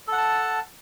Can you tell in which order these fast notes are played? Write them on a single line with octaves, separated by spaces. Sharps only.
A4 F#5 A5